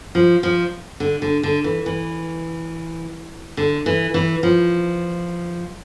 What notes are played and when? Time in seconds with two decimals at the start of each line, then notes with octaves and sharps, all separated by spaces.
0.15 F3
0.43 F3
1.00 D3
1.22 D3
1.43 D3
1.64 E3
1.86 E3
3.57 D3
3.86 E3
4.14 E3
4.43 F3